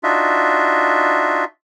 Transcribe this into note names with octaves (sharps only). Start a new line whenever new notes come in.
D4 D#4 F4 F#4 E5